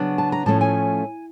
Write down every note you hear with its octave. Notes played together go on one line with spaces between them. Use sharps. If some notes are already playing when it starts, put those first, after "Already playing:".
Already playing: C#3 F#3 B3 D4
A5
A#5
A2 F3 A3 C#4 A5
G#5